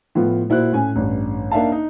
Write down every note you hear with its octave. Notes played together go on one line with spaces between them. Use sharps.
A2 F3 B3 F4
A#2 E4 F#4 C5 F#6
A2 C#4 G#5
A1 G2
A#3 D4 D#4 E5 F5 A5
D#4